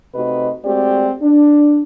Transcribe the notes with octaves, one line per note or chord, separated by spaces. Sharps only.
C3 A3 D#4 F#4 B4 D#5
G#3 A3 C4 F#4 G4 D5
D4